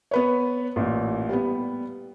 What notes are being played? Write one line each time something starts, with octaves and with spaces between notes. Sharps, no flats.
B3 B4 C#5
A1 A#2
G3 B3